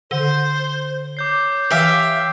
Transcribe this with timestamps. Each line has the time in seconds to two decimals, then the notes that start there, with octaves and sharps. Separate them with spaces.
0.11 D3 C5 G7
1.17 C#5 D6 G6 C7
1.71 E3 G4 E5 F5